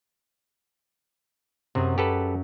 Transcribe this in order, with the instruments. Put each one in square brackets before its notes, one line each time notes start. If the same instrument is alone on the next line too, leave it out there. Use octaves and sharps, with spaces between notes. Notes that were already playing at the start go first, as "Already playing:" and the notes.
[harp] F#2 G#4 [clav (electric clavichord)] C3
[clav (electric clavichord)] G4 A4 B4